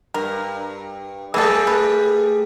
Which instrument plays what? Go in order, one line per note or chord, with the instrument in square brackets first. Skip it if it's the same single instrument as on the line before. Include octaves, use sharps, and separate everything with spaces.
[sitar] G2 [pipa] A#4
[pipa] E3 A4 [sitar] G3 A3 G#4
[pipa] B4